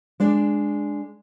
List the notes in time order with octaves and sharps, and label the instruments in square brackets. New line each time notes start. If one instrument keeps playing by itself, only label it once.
[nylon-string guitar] G#3 D4 D5